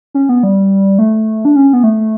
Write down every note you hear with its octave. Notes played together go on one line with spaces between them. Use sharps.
C#4
B3
G3
A3
D4
C#4
B3
A3